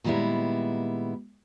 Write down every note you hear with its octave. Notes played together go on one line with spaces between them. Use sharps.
A#2 D#3 G3 G#3 B3 E4